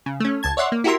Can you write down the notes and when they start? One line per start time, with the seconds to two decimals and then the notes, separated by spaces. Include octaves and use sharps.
0.06 C#3
0.20 A3 C#4
0.43 C#2 A5 G#6
0.57 C#5 D5 E5 F#5 C6
0.72 A#3
0.84 E4 F#4 G4 A#4 E5 C6